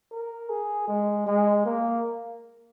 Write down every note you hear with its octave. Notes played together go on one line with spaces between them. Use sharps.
A#4
G#4
G#3
G#3
A#3